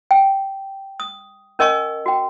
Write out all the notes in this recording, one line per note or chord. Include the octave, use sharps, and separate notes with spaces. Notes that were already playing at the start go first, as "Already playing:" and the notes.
G5
D#6
C#4 A#4 D#5 G#5 C#6
F#4 G5